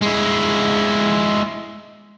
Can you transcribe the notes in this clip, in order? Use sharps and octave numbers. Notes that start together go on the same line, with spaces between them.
G#3 E4